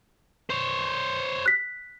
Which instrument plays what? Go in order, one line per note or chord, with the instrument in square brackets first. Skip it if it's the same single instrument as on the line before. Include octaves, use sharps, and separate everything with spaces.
[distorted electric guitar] C5 C#5
[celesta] F#6 B6